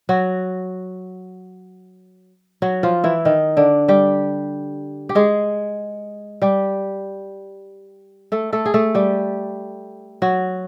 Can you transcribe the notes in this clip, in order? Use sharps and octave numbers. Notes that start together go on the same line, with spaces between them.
F#3 F#4
F#3 F#4
F3 F4
E3 E4
D#3 D#4
D3 D4
G3 G4
G4
G#3 G#4
G3 G4
A3 A4
A3 A4
G#4
A3 A4
G3 G4
F#3 F#4